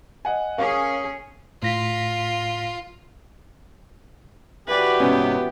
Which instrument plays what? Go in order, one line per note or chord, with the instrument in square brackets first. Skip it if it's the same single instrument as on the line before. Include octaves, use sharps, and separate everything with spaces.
[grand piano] D#5 F#5 G#5
[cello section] C#4 G#4 [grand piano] A#4 F5 C#6
[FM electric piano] A2 A#6 B6 [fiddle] F4
[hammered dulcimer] E3 F#4 [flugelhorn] G4 [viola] B4 D5
[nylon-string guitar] G#2 C3 C#4 [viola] B3